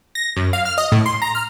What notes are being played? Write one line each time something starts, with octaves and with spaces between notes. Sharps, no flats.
A#6
F#2
F5
F6
D#5
A2
C6
A#5
F6